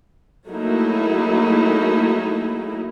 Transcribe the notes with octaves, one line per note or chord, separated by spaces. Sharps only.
F#3 A3 A#3 D#4 E4 G#4